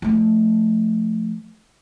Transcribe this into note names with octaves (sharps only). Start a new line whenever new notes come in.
F3 A3